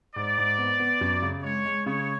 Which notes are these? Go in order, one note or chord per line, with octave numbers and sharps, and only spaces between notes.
G#2 D5
G#2
B3
B3
F#2
C#3
G#3 C#5
G#3
C#3 C#5